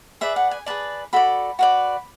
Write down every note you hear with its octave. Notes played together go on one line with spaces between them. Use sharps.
G#4 B4 D5 E5
F#5
G#5
G#4 B4 D5 A5
F#4 A4 D5 B5
F#4 B4 D5